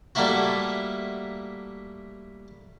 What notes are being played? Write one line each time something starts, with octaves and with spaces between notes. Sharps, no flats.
G3 A3 A#3 E4 F#4